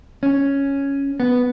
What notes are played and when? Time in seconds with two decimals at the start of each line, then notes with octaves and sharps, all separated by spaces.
0.23 C#4
1.20 B3